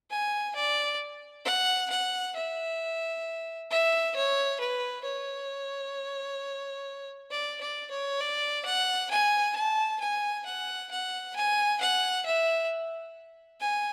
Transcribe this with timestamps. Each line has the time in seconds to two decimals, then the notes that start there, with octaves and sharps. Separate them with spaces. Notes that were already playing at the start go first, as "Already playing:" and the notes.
0.10 G#5
0.55 D5
1.45 F#5
1.90 F#5
2.36 E5
3.70 E5
4.15 C#5
4.60 B4
5.05 C#5
7.31 D5
7.60 D5
7.91 C#5
8.20 D5
8.65 F#5
9.10 G#5
9.55 A5
10.00 G#5
10.46 F#5
10.91 F#5
11.35 G#5
11.80 F#5
12.26 E5
13.60 G#5